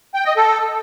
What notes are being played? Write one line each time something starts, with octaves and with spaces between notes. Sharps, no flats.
G5
D#5
A4